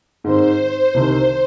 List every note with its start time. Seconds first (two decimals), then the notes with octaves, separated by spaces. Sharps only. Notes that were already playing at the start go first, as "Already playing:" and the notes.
0.24 G#2 D#3 C4 C5
0.94 C2 C3 D#3 C5